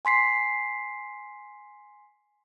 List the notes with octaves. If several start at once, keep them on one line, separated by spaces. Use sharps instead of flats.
G#5 C6 B6 C7